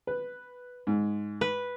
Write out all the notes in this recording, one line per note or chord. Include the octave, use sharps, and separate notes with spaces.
B4
G#2
B4